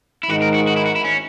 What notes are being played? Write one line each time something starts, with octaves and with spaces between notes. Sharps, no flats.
E4
G#2 D#3 G#3 D#4 F#4
A#4
F#4
F#4
E4
F#4
E4
C#4